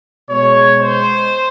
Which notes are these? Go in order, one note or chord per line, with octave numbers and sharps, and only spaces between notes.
B2 G#3 C#5
C5